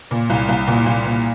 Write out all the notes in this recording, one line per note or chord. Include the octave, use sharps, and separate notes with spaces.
A#2
C2
C2
A#2
C2
A#2